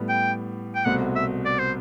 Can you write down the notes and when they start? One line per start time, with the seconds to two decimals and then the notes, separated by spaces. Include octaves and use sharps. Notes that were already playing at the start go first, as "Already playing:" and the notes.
Already playing: A2 G3 B3
0.09 G5
0.75 G5
0.85 C2 B2 A3 C4 F#4 F#5
1.16 E5
1.45 D5
1.59 C5